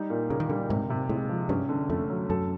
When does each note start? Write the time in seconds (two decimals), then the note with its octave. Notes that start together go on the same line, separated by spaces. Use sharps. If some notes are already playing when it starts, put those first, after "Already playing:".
Already playing: G3 D#4
0.10 A#2
0.30 C#3 A#3
0.40 D#3
0.49 D3 G3
0.69 G#2 C3
0.90 C3
1.09 A2 G#3
1.29 F3
1.49 G2 C#4
1.69 D3
1.89 F2 A3
2.10 F#3
2.30 F#2 A4